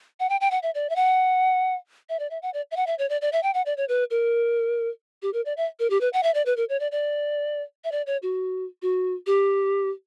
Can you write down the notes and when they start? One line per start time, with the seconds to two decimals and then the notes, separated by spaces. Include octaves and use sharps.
0.20 F#5
0.29 G5
0.41 G5
0.51 F#5
0.63 E5
0.75 D5
0.90 E5
0.96 F#5
2.09 E5
2.19 D5
2.31 E5
2.42 F#5
2.54 D5
2.71 E5
2.77 F#5
2.87 E5
2.99 C#5
3.09 D5
3.21 D5
3.32 E5
3.43 G5
3.54 F#5
3.66 D5
3.77 C#5
3.89 B4
4.11 A#4
5.22 G4
5.33 A#4
5.45 D5
5.57 E5
5.79 A#4
5.90 G4
6.01 B4
6.13 F#5
6.23 E5
6.34 D5
6.46 B4
6.57 A#4
6.69 C#5
6.80 D5
6.92 D5
7.84 E5
7.92 D5
8.07 C#5
8.23 F#4
8.82 F#4
9.27 G4